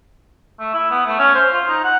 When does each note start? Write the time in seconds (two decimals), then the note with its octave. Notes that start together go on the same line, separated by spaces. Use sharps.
0.60 A3
0.74 E4
0.91 B3
1.06 A3
1.19 C#4
1.34 C5
1.52 F4
1.68 D#4
1.84 F#5